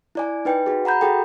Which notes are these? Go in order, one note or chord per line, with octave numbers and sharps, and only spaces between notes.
E4 D5 G#5
D#4 B4 G5
F#4 G#4
F#5 A#5 B5 G6
F#4 G#4 A4 G5